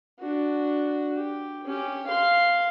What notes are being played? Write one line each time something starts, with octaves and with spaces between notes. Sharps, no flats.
D4 F#4
G4
C#4 G4
F5 C6